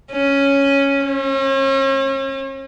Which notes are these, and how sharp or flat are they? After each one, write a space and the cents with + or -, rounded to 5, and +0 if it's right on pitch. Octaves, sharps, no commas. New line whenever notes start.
C#4 +0
C#4 -40